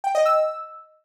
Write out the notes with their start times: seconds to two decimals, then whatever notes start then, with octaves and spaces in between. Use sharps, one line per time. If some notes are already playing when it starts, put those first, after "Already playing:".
0.04 G5
0.15 D#5
0.26 E6